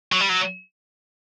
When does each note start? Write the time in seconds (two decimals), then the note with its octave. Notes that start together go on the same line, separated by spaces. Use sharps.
0.12 F#3
0.21 G3
0.29 F#3